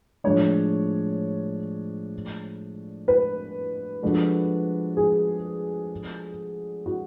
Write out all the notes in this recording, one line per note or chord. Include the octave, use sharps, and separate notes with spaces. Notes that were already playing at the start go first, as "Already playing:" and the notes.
A2 F3 G#3 D4 C#5
B4
F3 G#3 D4 F#4 A4
G#4
F#4